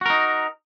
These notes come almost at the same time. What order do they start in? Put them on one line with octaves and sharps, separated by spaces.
F#4 A#4 D#4